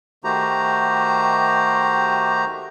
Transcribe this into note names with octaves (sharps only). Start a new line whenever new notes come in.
D#3 A3 F#4 G4 C5 A#5